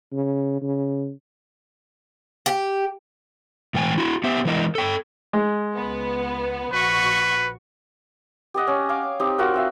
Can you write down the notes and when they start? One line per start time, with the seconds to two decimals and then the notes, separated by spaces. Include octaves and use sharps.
0.13 C#3
0.62 C#3
2.46 G4
3.74 A2 E3 G5 G#5
3.98 E4 F#4
4.24 B3 G4 E5
4.45 E3 G#3 E4 A#4 D#5
4.75 A4 G5
5.33 G#3
5.75 C#2 B3
6.73 A#1 F#4 B4 C#6
8.54 G4 D5 D#5 F#5
8.67 C#4
8.89 F5 G#5 D6
9.19 C4 D#4 G4
9.38 F4 F#4 A#4 G5
9.54 C4 E5 F5